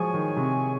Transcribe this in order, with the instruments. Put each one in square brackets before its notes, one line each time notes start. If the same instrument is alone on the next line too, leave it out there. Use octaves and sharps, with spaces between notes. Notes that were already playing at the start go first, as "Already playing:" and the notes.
Already playing: [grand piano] F3 F#3 G#3 [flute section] G#4 C#5 G#5 C#6
[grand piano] D#3
C3